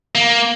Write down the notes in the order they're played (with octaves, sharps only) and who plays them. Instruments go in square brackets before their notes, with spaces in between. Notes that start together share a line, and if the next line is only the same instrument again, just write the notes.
[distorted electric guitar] A#3